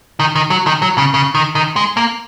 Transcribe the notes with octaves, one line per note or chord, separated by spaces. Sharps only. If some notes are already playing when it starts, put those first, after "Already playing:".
D#3
D#3
F#3
D#3
F#3
C#3
C#3
D#3
D#3
G#3
A#3